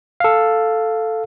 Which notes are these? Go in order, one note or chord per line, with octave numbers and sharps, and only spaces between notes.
A4 F5